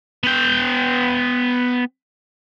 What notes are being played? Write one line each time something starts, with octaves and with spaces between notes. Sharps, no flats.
B3 G5